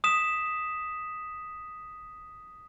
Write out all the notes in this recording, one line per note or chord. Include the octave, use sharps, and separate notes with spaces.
D#6 B6 E7